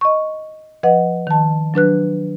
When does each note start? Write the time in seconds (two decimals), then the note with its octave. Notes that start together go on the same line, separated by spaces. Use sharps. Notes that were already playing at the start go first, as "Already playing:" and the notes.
0.01 D#5 C#6
0.83 F3 B4 D#5 F#5
1.27 D#3 A5
1.74 F#3 D4 B4 F#6